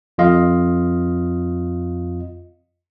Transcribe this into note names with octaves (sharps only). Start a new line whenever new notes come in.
F2 F4 D#5 F5